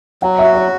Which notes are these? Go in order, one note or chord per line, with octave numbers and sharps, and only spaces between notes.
F#3 F#5
E5
F#4
C#5